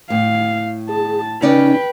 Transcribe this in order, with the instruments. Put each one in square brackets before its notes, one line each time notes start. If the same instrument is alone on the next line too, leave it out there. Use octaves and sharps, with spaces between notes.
[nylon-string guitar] A2 [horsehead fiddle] F5
[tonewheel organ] G#4 [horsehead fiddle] A5
[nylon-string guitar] C#3 C#4 D5 [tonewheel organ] D#4 [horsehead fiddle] B4 G5